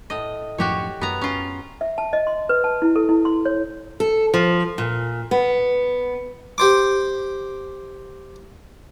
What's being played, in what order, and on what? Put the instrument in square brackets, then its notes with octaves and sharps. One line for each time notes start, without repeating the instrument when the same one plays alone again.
[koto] A2 D#5
[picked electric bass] F#2 A2 F3 [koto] F#4 G4 C#5
[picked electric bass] F#2 [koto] B3 A#5
[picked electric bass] F#2 [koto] C#4 F4
[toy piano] E5
A5
D#5
C6
B4
A5
E4
A4
E4
C6
C#5
[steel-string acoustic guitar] A4
F3
A#2
B3
[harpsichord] G4 C5 D6